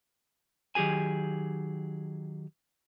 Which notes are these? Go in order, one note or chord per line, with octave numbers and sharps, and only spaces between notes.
D#3 F#3 G4 G#4 G#5